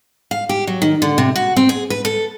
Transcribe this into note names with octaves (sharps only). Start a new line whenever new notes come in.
F5
G4
F#3
D#3
D3
C3
F#4
C4
G#4
B4
A4